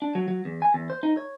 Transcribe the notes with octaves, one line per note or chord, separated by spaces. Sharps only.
D4
F#3
F#3
E2
G#5
E2
C5
D#4
C#5